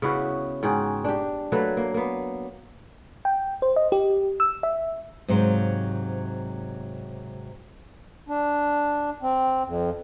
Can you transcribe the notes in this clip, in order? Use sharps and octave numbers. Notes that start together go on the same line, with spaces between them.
C#3 B3 E4 F#4
G#2 F#4 G#4 G5
D4 G4
F#3 A3 A#3 B4
A#3
A#3 B3
G5
C5
D#5
G4
E6
E5
G#2 C3 F#3 C5 F5
D4
C4
F2